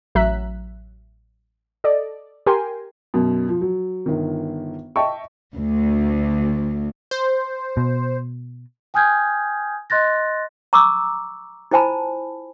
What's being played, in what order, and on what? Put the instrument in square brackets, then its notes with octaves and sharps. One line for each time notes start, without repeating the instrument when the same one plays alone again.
[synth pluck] A1 F#3 E5 A#5 F#6 B6
A4 D5 D#5
G4 A#4 G5 G#5 C6
[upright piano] F#2 B2
F3
F#3
G1 D#3
D#5 E5 G5 A5 C#6
[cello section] D2
[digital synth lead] C5
[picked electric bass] B2
[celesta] G5 G#5 D#6 F6 G6 G#6
D#5 C6 F#6 A6 A#6
[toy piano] A#5 C#6 D6 E6
E4 F4 C5 G#5 A5 B5